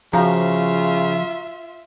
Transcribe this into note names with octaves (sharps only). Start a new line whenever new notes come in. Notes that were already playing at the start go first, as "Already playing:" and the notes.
C#3 F3 F4 F#4 E5 F5 A#5